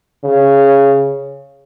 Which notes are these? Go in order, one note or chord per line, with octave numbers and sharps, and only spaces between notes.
C#3